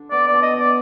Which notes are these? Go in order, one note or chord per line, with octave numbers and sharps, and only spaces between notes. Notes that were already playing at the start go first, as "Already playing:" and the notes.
Already playing: D3 D4
B3 D5
B2 D5
D#5
B2
D5